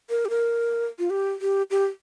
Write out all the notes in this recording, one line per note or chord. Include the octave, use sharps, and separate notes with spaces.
A#4
G4
A#4
F4
G4
G4
G4